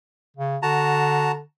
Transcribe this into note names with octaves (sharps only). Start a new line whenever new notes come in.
C#3
D3 F#4 A5 A#5